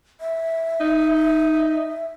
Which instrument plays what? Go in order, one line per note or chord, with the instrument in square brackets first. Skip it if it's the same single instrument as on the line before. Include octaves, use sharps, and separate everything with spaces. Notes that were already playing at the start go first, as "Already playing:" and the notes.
[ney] E5
[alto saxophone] D#4